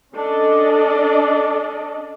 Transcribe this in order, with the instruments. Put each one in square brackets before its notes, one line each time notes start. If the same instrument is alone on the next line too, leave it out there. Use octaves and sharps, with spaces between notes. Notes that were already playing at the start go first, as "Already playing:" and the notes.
[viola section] C#4 D4 A4 D5 D#5